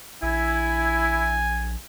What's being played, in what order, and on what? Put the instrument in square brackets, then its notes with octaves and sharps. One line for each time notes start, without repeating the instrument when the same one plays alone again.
[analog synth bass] A#1 [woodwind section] E4 [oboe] G#5